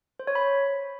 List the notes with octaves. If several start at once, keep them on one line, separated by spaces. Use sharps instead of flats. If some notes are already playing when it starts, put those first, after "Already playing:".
C5
C#5
B5